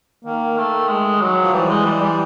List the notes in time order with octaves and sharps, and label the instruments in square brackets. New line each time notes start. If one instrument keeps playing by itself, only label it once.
[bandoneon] D#3 [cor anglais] A#3
[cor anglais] A3
G#3
F#3
[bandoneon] F3
[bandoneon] E3 [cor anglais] G3
[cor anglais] G#3
G3
G3